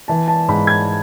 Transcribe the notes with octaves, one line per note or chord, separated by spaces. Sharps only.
E3 A5
A5
G#2 B5
G#6